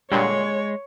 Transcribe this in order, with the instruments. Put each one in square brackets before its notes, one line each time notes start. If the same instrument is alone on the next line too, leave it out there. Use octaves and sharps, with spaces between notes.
[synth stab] A#2 D3 G3 [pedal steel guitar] G#3 C6 [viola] C#5